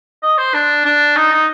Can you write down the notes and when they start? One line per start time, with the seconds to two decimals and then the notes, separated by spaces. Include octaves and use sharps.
0.22 D#5
0.38 C5
0.54 D4
0.85 D4
1.16 D#4
1.32 D#4